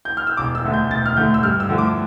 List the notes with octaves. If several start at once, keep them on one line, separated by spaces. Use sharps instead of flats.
G6
F6
E6
E1 D6
E6
D2 D3 A3
G6
E1 A6
F6
D2 D3 A3 G6
E6
G2 F6
E6
D3 F3 A3
D6